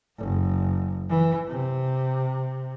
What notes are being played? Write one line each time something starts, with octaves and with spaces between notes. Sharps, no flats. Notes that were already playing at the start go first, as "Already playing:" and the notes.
F#1
E3
C3